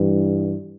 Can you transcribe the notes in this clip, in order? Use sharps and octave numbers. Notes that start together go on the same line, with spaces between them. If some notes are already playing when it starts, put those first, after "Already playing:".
Already playing: G2 E3